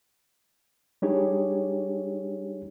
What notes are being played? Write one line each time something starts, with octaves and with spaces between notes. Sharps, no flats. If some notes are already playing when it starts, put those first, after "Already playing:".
G3 D4 D#4 G4 G#4 C#5